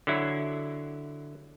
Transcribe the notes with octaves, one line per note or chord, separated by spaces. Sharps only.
D3 F#3 E4